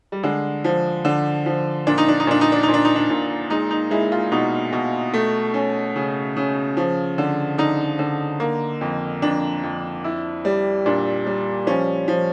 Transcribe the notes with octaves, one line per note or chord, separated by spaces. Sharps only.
G3
D3 G#3
F3
D3
F3
A#2 D4
D#4
D4
D#4
A#2 D4
D#4
D4
D#4
A#2
D4
D#4
D4
A#2
G#3 D#4
D#4
G#3 E4
F4
B2 D#4
B2
A3
C#4
C#3
C#3
F3
D3
D3 D#4
D3
A#3
F2
F2 D4
F2
E4
G3
A#2 D4
G3
F3 C#4
F3